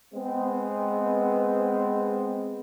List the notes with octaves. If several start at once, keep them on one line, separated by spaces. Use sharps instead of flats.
G#3 B3 C4